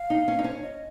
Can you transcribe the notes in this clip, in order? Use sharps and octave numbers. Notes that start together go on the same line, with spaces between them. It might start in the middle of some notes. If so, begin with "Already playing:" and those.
Already playing: F5
D#4
C#4
D#4
C#4 C5
C#5
D#5